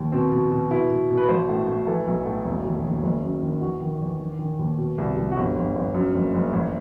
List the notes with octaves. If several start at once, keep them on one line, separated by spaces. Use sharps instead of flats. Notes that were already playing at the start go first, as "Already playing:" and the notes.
Already playing: D#2
B2 C4
B2
B2
B2 E4
B2
B2
B4
A1 C5
A2
A2
E3 A4
B1
A2
E1
D#2
D#2
F#1
F#2
D#3
E2 F#4
D#3
E2
D#3
D#3
D#2
B2
C2
C2
F#4
G1 G4
G1
G1
F#2
F#1
F#1
A1